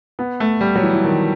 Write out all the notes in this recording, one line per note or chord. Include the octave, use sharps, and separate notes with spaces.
B3
A3
G3
F#3
E3
E3
D#3